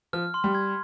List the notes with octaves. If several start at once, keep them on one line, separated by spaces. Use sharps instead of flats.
F3 F6
C6
G3
G#6